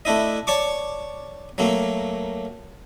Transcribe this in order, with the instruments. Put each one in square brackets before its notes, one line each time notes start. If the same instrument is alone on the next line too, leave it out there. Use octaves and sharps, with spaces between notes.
[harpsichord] A3 D4 E4 D#5
C#5 D5 A5 C#6 D6
F#3 A3 A#3